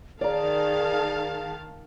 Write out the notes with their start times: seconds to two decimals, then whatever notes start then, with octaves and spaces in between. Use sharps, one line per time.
0.21 D#3 G#4 D5 F5 A5 A#5